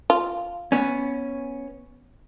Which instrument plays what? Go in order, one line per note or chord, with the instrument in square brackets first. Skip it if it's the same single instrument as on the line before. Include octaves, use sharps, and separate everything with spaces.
[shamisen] F4
[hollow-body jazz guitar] B3 C#4